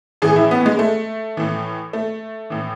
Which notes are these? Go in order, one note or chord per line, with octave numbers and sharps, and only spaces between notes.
A2 E3 G#4
E4
B3
G#3
A3
A2 E3
A3
A2 E3